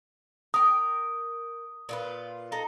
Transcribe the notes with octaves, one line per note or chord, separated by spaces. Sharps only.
A#4 G5 D#6
A#2 F4 B4
D#4 A4 A#5